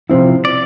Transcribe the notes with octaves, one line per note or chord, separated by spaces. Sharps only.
C3 F3 C4 E4
D5